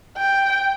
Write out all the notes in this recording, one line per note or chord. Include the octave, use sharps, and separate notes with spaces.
G5